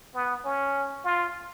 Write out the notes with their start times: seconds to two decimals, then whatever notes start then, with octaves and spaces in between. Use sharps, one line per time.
0.15 B3
0.45 C#4
1.04 F4